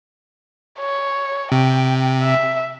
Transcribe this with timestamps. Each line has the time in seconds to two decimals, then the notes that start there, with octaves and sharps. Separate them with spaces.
0.79 C#5
1.52 C3 G5
2.22 E5